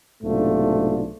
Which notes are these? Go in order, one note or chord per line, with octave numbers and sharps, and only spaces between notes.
B1 G#2 C3 A3 D4 F4